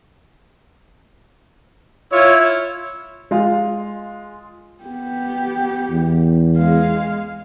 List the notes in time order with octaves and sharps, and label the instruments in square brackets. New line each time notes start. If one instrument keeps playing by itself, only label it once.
[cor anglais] E4 [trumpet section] F4 C#5
[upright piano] G#3 F4 F5
[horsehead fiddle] B3 G4
[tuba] E2
[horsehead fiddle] G#3 F5